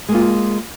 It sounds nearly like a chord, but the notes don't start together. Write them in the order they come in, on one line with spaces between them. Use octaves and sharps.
G#3 A#3 F4